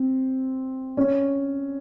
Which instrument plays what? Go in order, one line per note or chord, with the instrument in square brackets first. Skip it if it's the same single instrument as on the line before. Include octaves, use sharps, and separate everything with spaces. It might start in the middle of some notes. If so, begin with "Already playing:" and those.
Already playing: [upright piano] C4
C#4